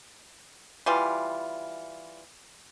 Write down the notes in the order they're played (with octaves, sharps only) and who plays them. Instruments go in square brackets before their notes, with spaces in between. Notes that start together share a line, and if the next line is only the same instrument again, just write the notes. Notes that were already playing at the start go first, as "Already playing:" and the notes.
[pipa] E3 G3 F4